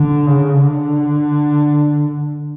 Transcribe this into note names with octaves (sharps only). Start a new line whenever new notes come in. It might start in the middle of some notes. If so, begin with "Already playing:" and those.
Already playing: D3
C#3
D3